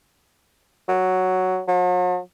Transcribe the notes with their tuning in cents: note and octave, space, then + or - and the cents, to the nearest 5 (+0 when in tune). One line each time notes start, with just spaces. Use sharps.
F#3 +0
F#3 -45